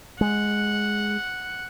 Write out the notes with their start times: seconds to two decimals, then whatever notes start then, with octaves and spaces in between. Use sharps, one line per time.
0.21 G#3 F#5